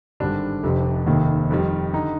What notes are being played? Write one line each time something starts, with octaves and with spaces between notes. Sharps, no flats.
G#1 G2 D3 G3 D4
F1 F2 C3
F1 D#2 D#3
F2 D#3 G3
D3 D#4